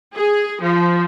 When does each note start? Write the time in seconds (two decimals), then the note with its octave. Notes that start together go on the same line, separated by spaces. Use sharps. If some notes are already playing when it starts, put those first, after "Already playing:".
0.15 G#4
0.63 F3